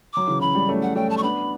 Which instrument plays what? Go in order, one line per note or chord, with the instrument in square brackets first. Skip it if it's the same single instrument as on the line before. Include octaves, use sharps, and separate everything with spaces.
[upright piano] F#3 [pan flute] D6
[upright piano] C#3 E3
[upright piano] C#3 E3 [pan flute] B5
[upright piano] E3 G3
A3 C#4
[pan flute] F#5
[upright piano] A3 C#4 [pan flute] G5
[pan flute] A5
C#6
[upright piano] B3 D4 [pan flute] B5